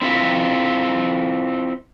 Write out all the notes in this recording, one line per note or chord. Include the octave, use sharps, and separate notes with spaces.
C4 E4 F4 E5